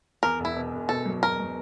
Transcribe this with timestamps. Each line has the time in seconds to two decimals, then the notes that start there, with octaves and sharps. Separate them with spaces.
0.23 E2 A#4
0.39 E1
0.45 E4
0.56 B2
0.73 E1
0.89 B2 A4
1.06 F#3
1.23 E1 A#4
1.39 F#3